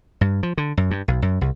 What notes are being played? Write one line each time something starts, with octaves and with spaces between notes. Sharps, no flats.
G2
F3
D3
F#2
G2
B1
F#2
C2